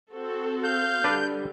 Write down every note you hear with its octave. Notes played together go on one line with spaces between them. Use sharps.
C4 F#4 A4
F5 G6
D3 G3 D4 B4 D5